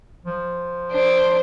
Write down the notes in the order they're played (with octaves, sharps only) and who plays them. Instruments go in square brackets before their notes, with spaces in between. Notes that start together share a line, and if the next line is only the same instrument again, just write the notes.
[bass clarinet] F3
[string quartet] D4 C5